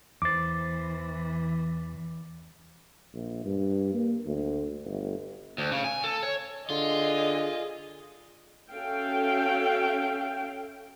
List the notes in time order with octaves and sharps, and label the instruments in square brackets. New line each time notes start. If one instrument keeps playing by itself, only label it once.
[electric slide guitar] E2 C5 [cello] E3 [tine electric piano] D6 A6
[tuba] A#1
G2
A#3
D2
G1
[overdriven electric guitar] D2
C#3
G#5
A4
C#5
[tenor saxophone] D3 [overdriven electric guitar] F4 [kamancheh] G#4 D#5
[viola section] C#4 F#4 A4 E5 F5 G5